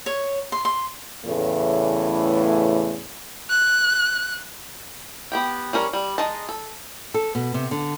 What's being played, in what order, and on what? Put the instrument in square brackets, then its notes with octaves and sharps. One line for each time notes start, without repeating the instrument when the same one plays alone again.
[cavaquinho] C#5
C6
C6
[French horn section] E2 A2 C#3 E3 A3
[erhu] F#6
[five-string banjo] B3 G4 G5
G3 C#4 A#4 C#5
G3
G#3 D#4 A5
A4
[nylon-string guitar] A4
B2
C3
D3